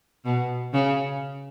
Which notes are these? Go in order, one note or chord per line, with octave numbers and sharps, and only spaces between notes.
B2
C#3